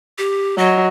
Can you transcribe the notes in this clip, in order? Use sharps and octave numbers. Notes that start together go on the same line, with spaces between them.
G4
F#3 D#5